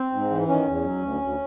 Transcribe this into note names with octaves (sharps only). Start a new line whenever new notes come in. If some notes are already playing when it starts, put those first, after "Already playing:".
Already playing: C4
G#2
E3
D#3 C#4
E2
F#3
D2
D2